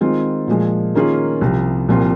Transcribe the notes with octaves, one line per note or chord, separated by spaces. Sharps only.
D#3 G#3 C4 F4
A#2 F3 G#3
D#3 A#3 C#4 F4 G#4
C2 C3 F3
C2 A#2 F3 C4 F4